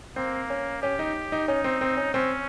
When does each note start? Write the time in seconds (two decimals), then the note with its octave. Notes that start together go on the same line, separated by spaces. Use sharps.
0.16 A#3 C4
0.50 C#4
0.82 C#4 G4
0.99 D#4
1.32 D#4
1.48 C#4 D#4
1.64 C4
1.81 C4
1.97 C#4
2.14 C4 C#4